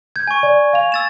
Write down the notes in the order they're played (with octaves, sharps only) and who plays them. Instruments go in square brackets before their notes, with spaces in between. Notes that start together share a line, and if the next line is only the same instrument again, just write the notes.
[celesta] G6 [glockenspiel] G#6
[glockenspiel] G#5 C#6
[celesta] D5
F5 F7
[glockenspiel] E6 A6 E7